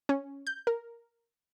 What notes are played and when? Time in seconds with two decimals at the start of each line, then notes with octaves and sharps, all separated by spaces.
0.09 C#4
0.47 G6
0.67 A#4